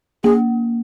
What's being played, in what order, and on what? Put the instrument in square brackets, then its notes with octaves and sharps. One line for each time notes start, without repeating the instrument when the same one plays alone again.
[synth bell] A#3 [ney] G#4